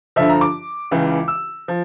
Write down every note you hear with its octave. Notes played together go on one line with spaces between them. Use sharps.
G2 D3 F3 E5
A#5
D6
C#2 C#3 E3
E6
F3